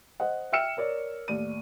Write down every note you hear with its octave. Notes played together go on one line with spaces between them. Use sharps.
C5 D#5 F#5
E5 G5 E6 F6 C#7 E7
A#4 C#5 D5
D#2 A2 D5 D#7